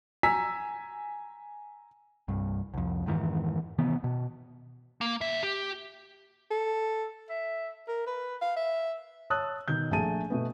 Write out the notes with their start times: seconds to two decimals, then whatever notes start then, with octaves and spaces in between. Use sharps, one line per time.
0.23 G#5 A#5 E6 B6
2.28 C2 G2
2.74 C2 F2
3.06 F2 G#2 D#3 E3
3.78 C3 D#3 E3 B3
4.04 B2
5.01 A#3
5.21 D2 E5
5.43 G4
6.50 A4
7.30 E5
7.88 A#4
8.07 B4
8.42 F5
8.56 E5
9.30 C#5 A5 D#6 E6 F#6
9.68 B2 D#3 G6
9.91 A#1 A3 G#4 G#5 A5 D#7
10.30 B2 A3 B3